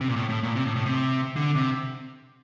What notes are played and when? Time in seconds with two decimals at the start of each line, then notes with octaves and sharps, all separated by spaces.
0.01 C3
0.08 A#2
0.16 A2
0.29 A2
0.43 A#2
0.56 C3
0.66 A2
0.76 A2
0.86 C3
1.36 D3
1.55 C3